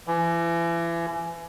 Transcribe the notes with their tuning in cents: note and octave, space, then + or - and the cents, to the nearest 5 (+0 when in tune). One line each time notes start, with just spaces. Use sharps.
E3 +35